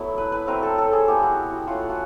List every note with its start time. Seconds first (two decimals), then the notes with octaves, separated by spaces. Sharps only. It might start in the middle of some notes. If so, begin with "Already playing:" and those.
Already playing: F#3 A3 B3 E4
0.18 B4
0.32 B4
0.47 F#3 A3 C4 A#4
0.63 A4
0.78 A4
0.93 G#4
1.08 G3 B3 E4 G4
1.23 F#4
1.53 F#4
1.67 A3 C#4 F4 F#4
1.90 F#4